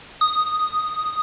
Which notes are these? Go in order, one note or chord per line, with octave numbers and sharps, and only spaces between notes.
D#6